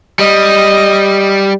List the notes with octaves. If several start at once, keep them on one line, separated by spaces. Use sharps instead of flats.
G3 D#5